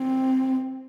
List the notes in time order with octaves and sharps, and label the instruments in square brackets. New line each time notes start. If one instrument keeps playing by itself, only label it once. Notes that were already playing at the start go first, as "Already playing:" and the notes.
Already playing: [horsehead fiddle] C4